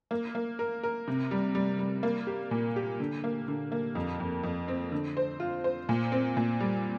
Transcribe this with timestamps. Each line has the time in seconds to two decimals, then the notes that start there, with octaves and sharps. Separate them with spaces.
0.11 A#3
0.35 A#3
0.59 A#4
0.83 A#4
1.08 C3
1.31 G3
1.55 G3
1.79 G3
2.03 A#3
2.27 G4
2.51 A#2
2.76 G4
3.00 D3
3.24 A#3
3.48 D3
3.72 A#3
3.95 F2
4.20 F2
4.43 F2
4.68 C4
4.92 D3
5.17 C5
5.40 F4
5.64 C5
5.89 A#2
6.12 C4
6.37 A#2
6.60 G3